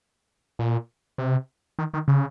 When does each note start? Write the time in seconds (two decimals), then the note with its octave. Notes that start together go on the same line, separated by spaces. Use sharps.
0.59 A#2
1.18 C3
1.79 D#3
1.94 D#3
2.08 C#3